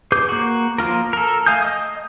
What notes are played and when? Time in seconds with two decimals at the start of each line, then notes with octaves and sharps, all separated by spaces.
0.12 G#4 B4 D6 G6
0.29 A#3 F#4
0.78 F3 A#3 F4 A#4
1.13 A4 A#4
1.46 A3 F5 G#5 D#6 G6
1.62 D#5 D#6